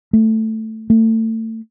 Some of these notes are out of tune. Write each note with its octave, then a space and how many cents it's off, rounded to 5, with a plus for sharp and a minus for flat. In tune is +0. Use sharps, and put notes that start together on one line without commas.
A3 +5
A3 +30